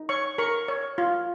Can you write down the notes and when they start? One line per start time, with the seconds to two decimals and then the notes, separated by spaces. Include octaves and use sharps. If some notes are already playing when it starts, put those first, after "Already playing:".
Already playing: D#4
0.09 C#5 C#6
0.38 A#4 C#6
0.68 C#5
0.98 F4